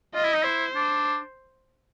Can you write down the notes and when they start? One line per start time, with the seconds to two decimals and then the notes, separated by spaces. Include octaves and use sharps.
0.15 F4 D#5
0.24 E4
0.34 D#4
0.43 E4 C5
0.75 D4